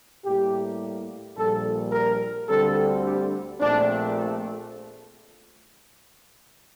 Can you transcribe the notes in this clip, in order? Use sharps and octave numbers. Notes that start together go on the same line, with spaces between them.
A2 G3 A#3 G4
A#1 A#2 G3 A4
A#4
D2 D3 G3 C4 A4
G4
A#1 A#2 A3 C4 D4